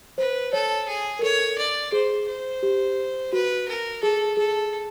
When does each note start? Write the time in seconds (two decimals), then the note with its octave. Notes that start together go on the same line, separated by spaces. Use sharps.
0.18 B4 C5
0.53 A4 C#5
0.88 G#4
1.19 A#4
1.23 A4 C#5
1.58 D5
1.92 G#4 C5
2.28 C5
2.63 G4
3.33 F#4 B4
3.68 A#4
4.03 G#4 A4
4.37 G#4 A4